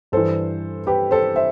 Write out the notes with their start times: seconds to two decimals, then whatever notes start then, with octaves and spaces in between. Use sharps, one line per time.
0.12 G2 E3 A4 C5
0.87 G4 B4
1.11 A4 C5
1.36 C5 E5